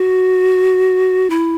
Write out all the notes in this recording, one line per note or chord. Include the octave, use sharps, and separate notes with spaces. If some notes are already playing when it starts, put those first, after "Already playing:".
Already playing: F#4
E4